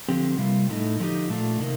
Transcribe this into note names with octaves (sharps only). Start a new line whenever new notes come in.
D3 F3 C4 G4
C3 G3 A#3 F4
A2 A3 D#4
D3 F3 A3 D#4 G4
A#2 A3 D4 F4
C3 D#3 A#3